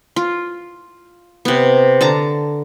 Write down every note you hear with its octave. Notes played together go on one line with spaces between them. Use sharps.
F4
C3 B3
D3 A5 A#5